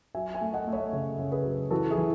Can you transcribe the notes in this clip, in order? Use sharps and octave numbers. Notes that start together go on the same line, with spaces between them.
F#3 E5 G#5
E5 G#5
A3
D#5 F#5
A3
C#5 E5
C#3
C#3
G#4 B4
F#3
E3 F#4 A4
E4 G#4
E3